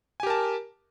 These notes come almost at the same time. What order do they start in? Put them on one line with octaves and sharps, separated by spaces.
G#5 G4 A#4 A5